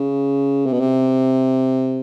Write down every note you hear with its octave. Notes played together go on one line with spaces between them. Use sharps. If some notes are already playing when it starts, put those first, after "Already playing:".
Already playing: C#3
C3
B2
C3